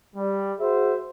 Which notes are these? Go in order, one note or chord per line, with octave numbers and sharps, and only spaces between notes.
G3
F#4 G#4 C5 E5